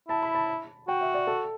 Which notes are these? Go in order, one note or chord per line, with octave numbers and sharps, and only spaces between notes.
E4 A5
B5
A5
F#4 G5
E5
D5
A4